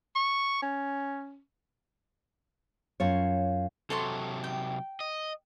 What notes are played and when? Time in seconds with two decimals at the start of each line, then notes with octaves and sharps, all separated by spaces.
0.15 C#6
0.62 C#4
3.00 F#2 F4 C#5
3.90 C3 F#3 A4 C#5 C6
4.44 G5
5.00 D#5